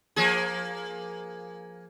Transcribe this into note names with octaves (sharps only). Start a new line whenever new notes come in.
F3 A#3 G#4